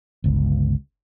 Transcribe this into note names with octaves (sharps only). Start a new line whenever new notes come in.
G1 C#2